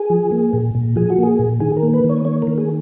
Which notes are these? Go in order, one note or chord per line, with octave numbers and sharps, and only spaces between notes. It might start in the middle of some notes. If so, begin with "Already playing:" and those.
Already playing: G#4
F3
A#3
A#2
A#2
F3 G#4
F#4
A#3 G#4
A#2
D#3 G#4
A#4
A#3
B4
D#3
C#5
A#3 C#5
A#4
D#3
G#4